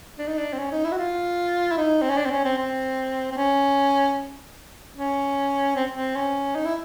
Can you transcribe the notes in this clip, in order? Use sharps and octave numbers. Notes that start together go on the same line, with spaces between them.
D4
D#4
D4
C4
C#4
D#4
E4
F#4
F4
E4
D#4
C4
C#4
D4
C4
C#4
C4
C4
C4
C#4
C#4
C4
C4
C#4
D#4
E4